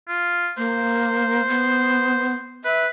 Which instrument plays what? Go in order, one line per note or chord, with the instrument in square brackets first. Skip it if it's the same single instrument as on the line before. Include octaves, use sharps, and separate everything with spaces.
[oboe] F4
[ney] A#3 [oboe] C5
[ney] B3
[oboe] B4 [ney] E5